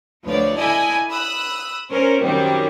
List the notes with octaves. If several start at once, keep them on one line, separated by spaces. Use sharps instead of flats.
D2 F3 B4 C#5 D5
E4 A4 D5 D#5 G#5 B5
B5 D#6 E6 F#6
C#4 A#4 C5
F#2 D#3 G3 C4